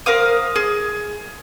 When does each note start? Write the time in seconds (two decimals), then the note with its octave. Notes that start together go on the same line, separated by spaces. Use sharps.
0.06 A#4 C5 F5 D#6
0.56 G#4